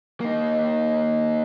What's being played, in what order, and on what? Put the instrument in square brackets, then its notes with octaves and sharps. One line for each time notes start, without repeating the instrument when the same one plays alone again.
[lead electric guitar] A#3 D#4